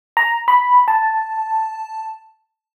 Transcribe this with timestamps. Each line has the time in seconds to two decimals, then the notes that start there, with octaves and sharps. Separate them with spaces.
0.17 A#5
0.48 B5
0.88 A5